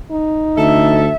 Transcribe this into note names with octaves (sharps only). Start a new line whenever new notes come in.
D#4
D2 A4 E5